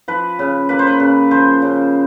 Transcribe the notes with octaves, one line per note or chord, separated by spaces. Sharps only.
F3 B4
C#3
A#3 B4
C5
B4
C#3
F3 C5
C#3